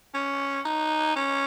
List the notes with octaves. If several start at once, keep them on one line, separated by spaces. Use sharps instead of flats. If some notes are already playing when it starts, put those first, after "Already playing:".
C#4
D#4
C#4